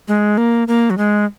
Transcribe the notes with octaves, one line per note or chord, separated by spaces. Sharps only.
G#3
A#3
A#3
F#3
G#3